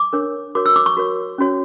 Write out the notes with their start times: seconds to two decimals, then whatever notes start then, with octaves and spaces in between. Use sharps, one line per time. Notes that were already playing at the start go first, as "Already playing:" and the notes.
Already playing: D6
0.13 D4 A#4 C#5
0.55 F#4 A#4 C#5 D6
0.66 E6
0.76 D6
0.86 C#6
0.97 F#4 A#4 C#5
1.38 C#4 F#4 C#5